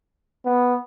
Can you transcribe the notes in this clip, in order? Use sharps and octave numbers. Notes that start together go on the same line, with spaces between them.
B3